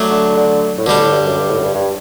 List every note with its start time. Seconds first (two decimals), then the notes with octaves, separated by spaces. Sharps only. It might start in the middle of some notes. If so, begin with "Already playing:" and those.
Already playing: F#3 A3 D4
0.11 D3
0.36 D3
0.78 A2
0.86 B2 D3 G3 D4
0.99 A2
1.12 G2
1.25 F#2
1.38 G2
1.50 A2
1.57 F#2
1.63 G2
1.75 G2